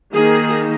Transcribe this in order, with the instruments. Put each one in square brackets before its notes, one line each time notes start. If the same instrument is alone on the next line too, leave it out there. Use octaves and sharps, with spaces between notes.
[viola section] D#3 A#3 D#4 G#4